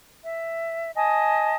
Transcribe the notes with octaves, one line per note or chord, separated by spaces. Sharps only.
E5
D#5 G#5 A5 D#6